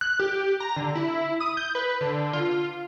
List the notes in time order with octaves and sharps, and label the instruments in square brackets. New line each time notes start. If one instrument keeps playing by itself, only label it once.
[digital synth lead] F#6
G4
A#5
D3
E4
D#6
G6
B4
D3
F4